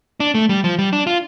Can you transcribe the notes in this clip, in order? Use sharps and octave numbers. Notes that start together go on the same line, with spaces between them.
D4
A3
G3
F3
G3
D4
F4